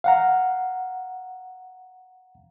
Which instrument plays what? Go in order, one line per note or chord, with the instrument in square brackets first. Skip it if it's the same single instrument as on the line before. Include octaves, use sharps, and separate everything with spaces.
[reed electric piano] F5 F#5 A#5